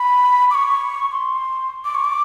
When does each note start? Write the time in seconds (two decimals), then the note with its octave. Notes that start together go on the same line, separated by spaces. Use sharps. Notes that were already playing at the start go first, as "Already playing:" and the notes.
Already playing: B5
0.51 D6
0.54 C#6
1.12 C6
1.85 D6
1.95 C#6
2.05 D6